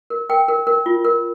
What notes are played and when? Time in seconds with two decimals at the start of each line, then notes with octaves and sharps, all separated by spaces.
0.10 A#4
0.29 A#4 G5
0.48 A#4
0.67 A#4
0.86 F4
1.04 A#4